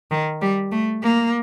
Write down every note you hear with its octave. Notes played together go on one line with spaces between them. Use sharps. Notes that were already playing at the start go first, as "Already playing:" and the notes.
D#3
G3
A3
A#3